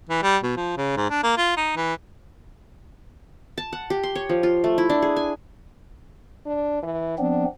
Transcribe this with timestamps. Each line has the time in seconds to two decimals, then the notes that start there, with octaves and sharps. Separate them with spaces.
0.10 E3
0.23 G3
0.43 B2
0.57 F3
0.77 C#3
0.97 G#2
1.10 D4
1.23 A#3
1.37 F4
1.57 D#4
1.76 E3
3.58 A5
3.73 F#5
3.90 G4
4.03 C6
4.15 C#5
4.29 F3
4.43 F4
4.64 A3
4.78 E4
4.90 D4
5.02 G#4
5.16 G#5
6.46 D4
6.83 E3
7.18 F3 B3 C4 D4